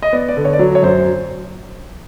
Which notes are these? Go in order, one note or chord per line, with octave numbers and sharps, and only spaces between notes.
D#5
B3 D5
D5
D3
C#5
D5
F#3 C#5
C#5
F#2 C5